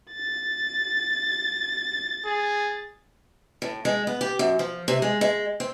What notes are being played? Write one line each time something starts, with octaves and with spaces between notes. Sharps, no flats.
A6
G#4
A2
G#3
B3
G4
F#2
F3
C3
G#3
G#3
C4